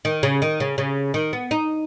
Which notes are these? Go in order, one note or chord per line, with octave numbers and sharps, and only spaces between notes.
D#3
C#3
D#3
C#3
C#3
D#3
B3
D#4